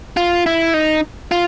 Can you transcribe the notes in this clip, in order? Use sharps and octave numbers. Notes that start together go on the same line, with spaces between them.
F4
E4
D#4
F4